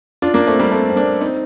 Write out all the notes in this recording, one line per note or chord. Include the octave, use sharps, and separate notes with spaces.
D4 F4
A#3 D4
A3 C4
G3 A#3
A3 C4
C4
A#3 D4
C4 D#4